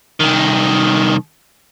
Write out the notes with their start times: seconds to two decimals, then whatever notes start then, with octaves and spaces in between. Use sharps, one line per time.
0.20 C2 D#3